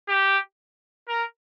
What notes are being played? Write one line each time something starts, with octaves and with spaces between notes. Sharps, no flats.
G4
A#4